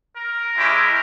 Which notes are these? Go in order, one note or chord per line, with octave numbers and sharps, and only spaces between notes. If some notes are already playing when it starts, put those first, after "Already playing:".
A#4
G#3 C#4 E4 G4